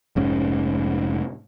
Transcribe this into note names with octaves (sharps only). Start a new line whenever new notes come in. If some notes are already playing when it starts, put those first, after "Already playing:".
F1 G#2 C#4